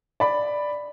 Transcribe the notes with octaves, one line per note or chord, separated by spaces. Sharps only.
D5 B5